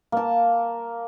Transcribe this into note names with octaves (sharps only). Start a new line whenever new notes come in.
A#3 A5